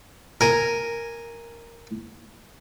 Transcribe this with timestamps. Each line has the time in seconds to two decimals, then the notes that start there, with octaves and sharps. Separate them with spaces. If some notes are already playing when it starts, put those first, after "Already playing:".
0.41 A#4 G#5